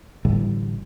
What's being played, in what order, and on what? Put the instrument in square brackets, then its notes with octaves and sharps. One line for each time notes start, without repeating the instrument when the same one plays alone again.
[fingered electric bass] A1 A2 D3 G3